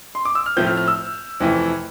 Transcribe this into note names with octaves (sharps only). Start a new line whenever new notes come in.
C6
D6
E6
F6
A2 F3 A3 C4 G6
F6
F6
E6
F2 C3 E3 A3